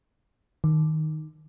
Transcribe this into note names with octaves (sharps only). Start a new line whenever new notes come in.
D#3